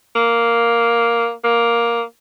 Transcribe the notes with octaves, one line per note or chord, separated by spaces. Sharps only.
A#3
A#3